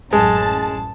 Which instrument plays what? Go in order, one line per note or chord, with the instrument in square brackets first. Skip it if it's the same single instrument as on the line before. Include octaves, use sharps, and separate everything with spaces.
[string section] A1 F#2 A5 [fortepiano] G#3